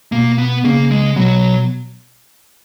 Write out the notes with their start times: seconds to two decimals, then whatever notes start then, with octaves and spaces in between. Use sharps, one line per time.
0.12 B2 A#3
0.38 B3
0.64 C#3 A#3
0.91 G#3
1.16 B2 F#3